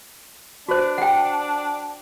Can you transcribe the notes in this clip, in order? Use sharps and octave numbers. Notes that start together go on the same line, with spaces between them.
D4 F#4 C5
F#5 G5